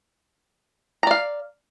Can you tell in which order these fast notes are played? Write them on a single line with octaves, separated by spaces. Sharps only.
A#5 D5 F5